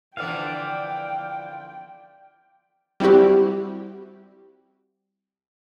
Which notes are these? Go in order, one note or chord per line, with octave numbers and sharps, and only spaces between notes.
D3 E3 F3 D5 F5 G5
G3 C4 E4 F#4 G4